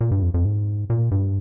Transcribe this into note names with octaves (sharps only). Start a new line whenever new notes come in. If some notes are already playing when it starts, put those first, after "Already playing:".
A#2
G2
F2
F2
G#2
A#2
G2